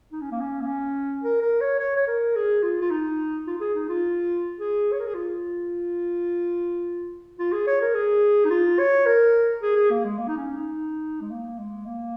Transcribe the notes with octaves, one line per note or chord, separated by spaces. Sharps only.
D#4
C#4
A#3
C#4
A#3
C#4
A#4
A#4
C#5
C#5
C#5
A#4
G#4
F4
F4
D#4
F4
F4
G#4
D#4
F4
G#4
C#5
A#4
G#4
F4
F4
G#4
C#5
A#4
G#4
D#4
F4
C#5
A#4
G#4
G#4
A#3
G#3
A#3
D#4
C#4
D#4
G#3
A#3
G#3
A#3